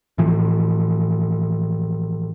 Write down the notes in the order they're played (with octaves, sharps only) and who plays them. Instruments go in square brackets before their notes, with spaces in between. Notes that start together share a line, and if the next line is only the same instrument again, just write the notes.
[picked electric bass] A2 E3 F3